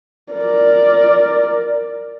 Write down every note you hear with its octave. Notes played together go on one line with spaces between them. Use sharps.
A#4 D5